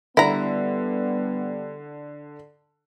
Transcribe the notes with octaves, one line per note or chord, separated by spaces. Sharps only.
D3 G3 B3 E4 A#5